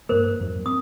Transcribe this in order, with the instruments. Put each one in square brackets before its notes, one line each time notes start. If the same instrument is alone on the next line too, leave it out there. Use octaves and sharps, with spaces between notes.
[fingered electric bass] G2 A#3 [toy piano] A#4 C5
[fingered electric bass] F2 G#2 F#3
[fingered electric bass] C4 [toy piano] D#6